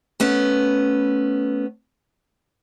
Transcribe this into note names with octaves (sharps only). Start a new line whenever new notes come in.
A3 B3 C#4